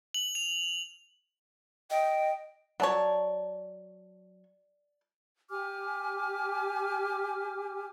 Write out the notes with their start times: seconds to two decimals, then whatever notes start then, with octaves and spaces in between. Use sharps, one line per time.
0.14 F#7
0.35 F7
1.91 D#5 G5
2.80 F#3 C#5 D5 A5
5.49 G4 G#5 D6 F6